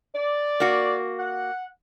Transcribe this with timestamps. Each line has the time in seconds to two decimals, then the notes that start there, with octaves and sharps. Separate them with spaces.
0.15 D5
0.60 A#3 F#4
1.20 F#5